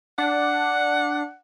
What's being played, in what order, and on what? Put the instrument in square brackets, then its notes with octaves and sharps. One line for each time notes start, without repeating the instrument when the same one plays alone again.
[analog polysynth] D4 [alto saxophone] F#5